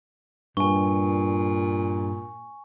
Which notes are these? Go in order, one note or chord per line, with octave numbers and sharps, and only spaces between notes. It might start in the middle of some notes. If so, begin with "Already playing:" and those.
G2 A#2 G#5 C#6